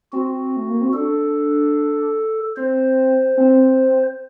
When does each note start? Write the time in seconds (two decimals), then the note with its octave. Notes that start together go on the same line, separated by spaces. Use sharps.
0.12 C4 F#4
0.56 A3
0.69 A#3
0.81 C4
0.93 D4 A4
2.57 C4 C5
3.37 C4